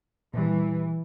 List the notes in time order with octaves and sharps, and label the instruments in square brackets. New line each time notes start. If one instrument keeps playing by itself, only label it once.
[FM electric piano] A#2 G3 [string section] E3